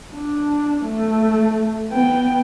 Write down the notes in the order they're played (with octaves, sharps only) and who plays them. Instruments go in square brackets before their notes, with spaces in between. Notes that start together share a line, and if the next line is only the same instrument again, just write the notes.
[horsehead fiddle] D4
A3
B3 G5